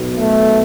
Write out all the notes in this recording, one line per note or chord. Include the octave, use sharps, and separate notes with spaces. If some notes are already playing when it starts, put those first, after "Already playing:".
Already playing: B1 B2
A3